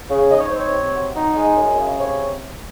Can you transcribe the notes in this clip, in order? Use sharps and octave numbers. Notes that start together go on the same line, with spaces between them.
C#3
D#4 D#5
C#5
C4 C5
C#5
C3
F#3
D#4
G#3
F#2
C#3
C3 C#5